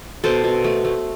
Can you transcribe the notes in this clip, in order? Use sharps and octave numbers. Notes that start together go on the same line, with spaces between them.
B2 A4 C5
B2
A3
A3